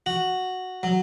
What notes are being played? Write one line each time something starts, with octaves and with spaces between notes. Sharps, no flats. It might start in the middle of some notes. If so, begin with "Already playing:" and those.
F#4
F#3